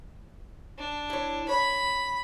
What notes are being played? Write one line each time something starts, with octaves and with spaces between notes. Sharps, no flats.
D4
E4 C#5
C#5 B5